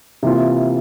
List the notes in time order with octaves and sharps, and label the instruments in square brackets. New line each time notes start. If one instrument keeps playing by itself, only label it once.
[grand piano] C3 E3 A#3 F4